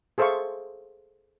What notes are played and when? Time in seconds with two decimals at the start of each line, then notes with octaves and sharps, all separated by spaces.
0.18 G#4 A4 C5 E5 F5 C#6